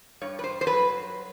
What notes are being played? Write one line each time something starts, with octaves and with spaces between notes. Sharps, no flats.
G2 C#5
B4
C5
C5
F#3 B4